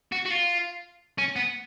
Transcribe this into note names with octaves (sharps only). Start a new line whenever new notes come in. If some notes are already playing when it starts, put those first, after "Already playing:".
F#4
F#4
F4
C#4
B3